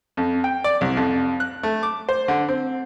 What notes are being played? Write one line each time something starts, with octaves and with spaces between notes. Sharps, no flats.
F2
G5
D5
C2
F2
F#6
A3
D6
C5
D3
C4